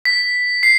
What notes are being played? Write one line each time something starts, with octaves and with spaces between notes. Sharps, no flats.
B6
C7